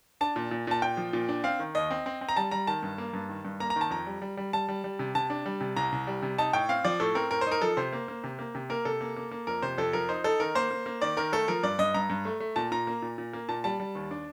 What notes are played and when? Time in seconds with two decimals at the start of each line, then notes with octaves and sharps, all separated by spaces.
0.21 D4 A5
0.36 A#2
0.51 A#2
0.67 A#2 A5
0.82 A#2 G5
0.97 F3
1.13 A#2
1.29 D4
1.44 C4 F5
1.59 D#3
1.75 D#2 D#5
1.91 C4
2.06 C4
2.21 C4
2.29 A#5
2.37 G3 A5
2.51 G3 A#5
2.67 D#3 A5
2.83 G2
2.98 A#3
3.13 G2
3.29 D#3
3.45 G2
3.60 A#3 A#5
3.70 A#5
3.76 D#3
3.81 A5
3.90 F2 A#5
4.07 G3
4.22 G3
4.37 G3
4.53 G3 A5
4.69 G3
4.84 G3
4.99 C3
5.15 C3 A5
5.30 D4
5.46 G3
5.61 C3
5.76 C2 A#5
5.92 C2
6.07 G3
6.22 C3
6.38 D#4 A5
6.53 A2 G5
6.69 C4 F5
6.84 F3 D5
7.00 A2 A4
7.15 C4 A#4
7.31 A2 A#4
7.41 C5
7.46 D#4
7.52 A#4
7.61 F3 A4
7.77 C3 C5
7.93 A#3
8.08 A#3
8.24 C3
8.39 A#3
8.55 C3
8.70 A#3 A#4
8.85 C3 A4
9.01 A#3
9.16 A#3
9.31 A#3
9.47 F2 A#4
9.62 C3 C5
9.78 F2 A4
9.93 F3 A#4
10.09 D#4 C5
10.24 D#4 A4
10.40 D#3 A#4
10.55 A#3 C5
10.71 A#3
10.86 A#3
11.02 D#3 D5
11.17 D#3 A#4
11.32 A3 A4
11.48 F3 A#4
11.63 G2 D5
11.79 G2 D#5
11.94 G2 A#5
12.10 G2
12.25 A3
12.40 A3
12.56 A#2 A5
12.72 A#2 A#5
12.87 A#3
13.02 A#2
13.18 A#2
13.33 A#3
13.48 A#2 A5
13.64 G3 A5
13.80 G3
13.95 D#2
14.11 D4